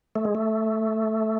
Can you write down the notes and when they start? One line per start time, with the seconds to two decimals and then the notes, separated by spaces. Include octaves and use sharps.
0.15 A3
0.25 G#3
0.35 A3